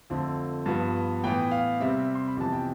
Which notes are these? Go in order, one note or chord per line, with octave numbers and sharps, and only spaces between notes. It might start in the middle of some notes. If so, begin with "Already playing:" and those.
F2 D3 F3 A3 C4
G2 F3 B3
A2 E3 B3 G5
F5
C3 G3 C4 E5
C6
B5
F2 C3 E3 B3 A5
G5